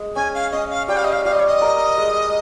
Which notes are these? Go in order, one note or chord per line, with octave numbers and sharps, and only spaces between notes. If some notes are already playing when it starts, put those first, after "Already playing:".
Already playing: G#3
C#4 G#5
F5
C#4 D#5
F5
G3 G5
F5
D#5
F5
G3 F5
D#5
C#5
D#5
A#4
G#3